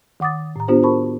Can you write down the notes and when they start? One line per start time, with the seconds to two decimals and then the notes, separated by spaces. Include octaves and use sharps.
0.20 D#3 F#5 D6 D#6 A6
0.56 A2 A#5
0.68 B3 D4 F4 G4 C5
0.83 F#4 A#4 C5 A5 B5 C#6